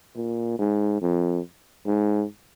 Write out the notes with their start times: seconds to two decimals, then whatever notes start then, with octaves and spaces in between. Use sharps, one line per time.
0.16 A#2
0.59 G#2
1.02 F2
1.86 G#2